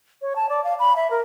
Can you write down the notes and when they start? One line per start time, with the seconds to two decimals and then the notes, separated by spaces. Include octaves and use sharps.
0.22 C#5
0.36 A5
0.49 D5
0.64 F5
0.79 B5
0.96 E5
1.11 A#4